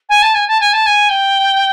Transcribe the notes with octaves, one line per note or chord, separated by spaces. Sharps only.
G#5
A5
G#5
A5
G#5
A5
G#5
G5